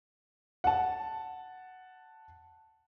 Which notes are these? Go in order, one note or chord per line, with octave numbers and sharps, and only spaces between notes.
F#5 A5